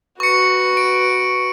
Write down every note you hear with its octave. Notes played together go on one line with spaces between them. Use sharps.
F#4 B4 C#6 C#7
D7